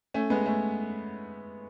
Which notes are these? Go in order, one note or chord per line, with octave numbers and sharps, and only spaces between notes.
A3 C#4
G#3 B3
A3 C#4